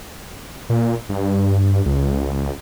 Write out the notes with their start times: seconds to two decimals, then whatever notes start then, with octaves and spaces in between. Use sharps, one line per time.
0.69 A#2
1.09 G2
1.86 C#2